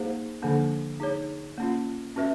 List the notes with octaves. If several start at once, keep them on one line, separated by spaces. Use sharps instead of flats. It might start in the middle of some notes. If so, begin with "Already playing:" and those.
Already playing: A#3 D#4 G#4 C5 F5
D3 F3 A#3 D4
D#4 G#4 C#5
A#3 C#4 F4
C#4 F#4 B4 E5